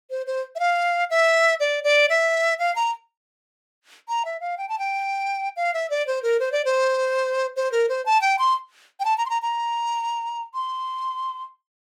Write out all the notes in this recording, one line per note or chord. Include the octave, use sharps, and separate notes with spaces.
C5
C5
E5
F5
E5
D5
D5
E5
F5
A#5
A#5
E5
F5
G5
A5
G5
F5
E5
D5
C5
A#4
C5
D5
C5
C5
A#4
C5
A5
G5
C6
G5
A5
A#5
C6
A#5
A#5
C6